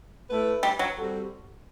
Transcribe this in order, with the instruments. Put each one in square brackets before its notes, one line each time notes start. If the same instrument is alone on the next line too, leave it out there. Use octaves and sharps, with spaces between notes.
[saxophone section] A3 E4 B4
[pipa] G3
F#3
[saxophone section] G3 C4 F#4 A4